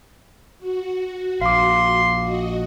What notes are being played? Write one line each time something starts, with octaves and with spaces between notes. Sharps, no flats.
F#4
A#1 F5 C6 D6
F#4 D#5